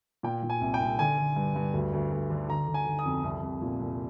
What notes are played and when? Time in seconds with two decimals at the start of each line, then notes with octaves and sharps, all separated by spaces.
0.23 A#2 G5
0.43 A#2
0.50 G#5
0.61 C2
0.74 G5
0.80 C2
0.99 D3 G#5
1.18 D3
1.36 G2
1.56 G2
1.74 D2
1.93 D2
2.12 D2
2.30 D3
2.49 D3 A#5
2.68 D3
2.74 G#5
2.86 D3
2.99 D#6
3.05 F2
3.24 C2
3.43 C2
3.62 A#2
3.80 C2